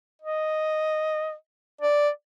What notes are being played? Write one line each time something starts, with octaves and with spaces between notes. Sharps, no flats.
D#5
D5